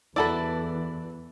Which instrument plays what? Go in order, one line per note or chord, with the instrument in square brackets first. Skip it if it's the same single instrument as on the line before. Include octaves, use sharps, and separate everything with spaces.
[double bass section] E2 E3 [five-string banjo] E4 F#4 A4 [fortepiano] D5 A5 B5